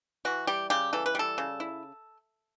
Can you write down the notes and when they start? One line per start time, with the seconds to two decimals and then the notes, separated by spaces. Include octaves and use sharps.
0.25 E3 F#4
0.47 G3 G4
0.70 C#3 G4
0.93 E3 A4
1.06 B4
1.15 G3 A4
1.38 C#3
1.60 E4